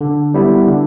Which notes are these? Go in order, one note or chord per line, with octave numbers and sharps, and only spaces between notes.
D3
G3 B3 E4
D3